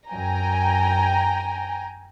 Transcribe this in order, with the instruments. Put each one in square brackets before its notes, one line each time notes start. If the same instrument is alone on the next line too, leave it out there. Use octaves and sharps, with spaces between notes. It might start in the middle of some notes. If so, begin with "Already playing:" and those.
[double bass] F#2 [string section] G5 G#5 A#5